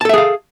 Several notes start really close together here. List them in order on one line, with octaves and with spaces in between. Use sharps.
A5 A4 E5 G#4 F5